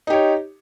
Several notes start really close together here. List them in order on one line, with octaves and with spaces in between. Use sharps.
D#4 G4 C#5